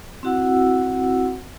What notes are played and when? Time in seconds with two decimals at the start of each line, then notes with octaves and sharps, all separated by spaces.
0.23 C4 E4 F#4 F#5 E6